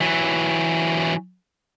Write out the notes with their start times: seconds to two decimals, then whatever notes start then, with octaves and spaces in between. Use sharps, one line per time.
0.01 E3 F#3